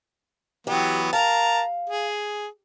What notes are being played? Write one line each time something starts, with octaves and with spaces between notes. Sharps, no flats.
E3 F#3 B3 G4
A#4 F5 A5 A#5
G#4